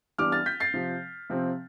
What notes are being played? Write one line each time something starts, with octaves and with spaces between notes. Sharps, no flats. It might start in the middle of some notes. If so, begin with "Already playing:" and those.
E3 G3 B3 D4 D6 F6
F6 A6
G6 B6
A6 C7
C3 F3 C4
C3 F3 C4